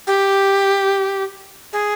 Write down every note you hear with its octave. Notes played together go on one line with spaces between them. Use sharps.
G4
G#4